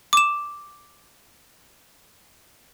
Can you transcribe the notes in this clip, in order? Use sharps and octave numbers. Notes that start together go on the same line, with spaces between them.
D6 E7